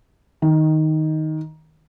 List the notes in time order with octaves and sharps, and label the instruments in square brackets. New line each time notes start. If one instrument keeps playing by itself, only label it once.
[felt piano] D#3